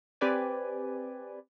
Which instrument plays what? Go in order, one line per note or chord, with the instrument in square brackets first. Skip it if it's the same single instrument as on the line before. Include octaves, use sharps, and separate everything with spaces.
[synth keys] C4 G4 B4 D5 G#5